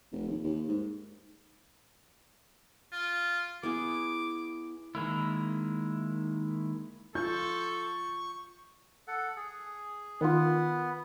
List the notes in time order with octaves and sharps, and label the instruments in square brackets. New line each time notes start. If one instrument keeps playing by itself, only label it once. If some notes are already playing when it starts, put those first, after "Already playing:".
[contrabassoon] F1
D#2
D#2
G#2
[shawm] F4
[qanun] B3 E4 G#4 [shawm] D6
[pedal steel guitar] D#3 G#3 A#3 E4
[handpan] F4 [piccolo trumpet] A4 [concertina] C#6 [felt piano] G6
[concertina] A4 F#5
G#4
[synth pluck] D#3 F4 [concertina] B3